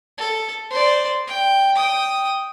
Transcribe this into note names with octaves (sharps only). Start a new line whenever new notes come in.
A4
C5 D5
G5
G5 D#6